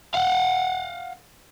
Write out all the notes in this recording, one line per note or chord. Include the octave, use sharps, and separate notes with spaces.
F5 F#5